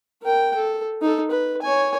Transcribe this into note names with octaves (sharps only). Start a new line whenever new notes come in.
A#4 G5
A4
D#4 A4
B4
C#5 G#5